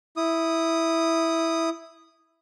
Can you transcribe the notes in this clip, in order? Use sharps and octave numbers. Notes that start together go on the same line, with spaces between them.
E4 D#6